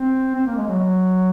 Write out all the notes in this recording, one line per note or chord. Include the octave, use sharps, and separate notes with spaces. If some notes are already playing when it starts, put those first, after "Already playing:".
Already playing: C4
C4
A#3
G#3
F#3
F#3